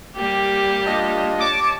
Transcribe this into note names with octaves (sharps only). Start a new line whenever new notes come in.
G3 A#3 G4
D4 F4 D#5
C#5 A5 D6